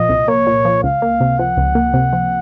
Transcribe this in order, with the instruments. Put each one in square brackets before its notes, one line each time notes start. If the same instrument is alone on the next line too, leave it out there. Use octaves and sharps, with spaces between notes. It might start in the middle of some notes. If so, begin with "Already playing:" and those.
Already playing: [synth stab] A#2 F3 [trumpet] D#5
[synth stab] C2
[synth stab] A#3 [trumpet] C#5
[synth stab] A#2
F3
[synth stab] C#2 [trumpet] F5
[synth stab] A#3
C3
[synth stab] F3 [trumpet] F#5
[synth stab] C#2
A#3
C3
F3